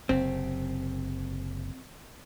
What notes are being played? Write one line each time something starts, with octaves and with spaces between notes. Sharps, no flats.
F#1 C3 C4